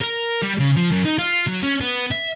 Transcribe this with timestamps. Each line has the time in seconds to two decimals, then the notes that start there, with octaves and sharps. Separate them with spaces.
0.02 A#4
0.42 G3
0.59 C#3
0.76 F3
0.91 F#2
1.05 D#4
1.18 F4
1.47 F#3
1.63 C#4
1.81 B3
2.12 E5